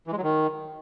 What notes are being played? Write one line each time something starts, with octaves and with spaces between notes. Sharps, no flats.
E3
G#3
F#3
D#3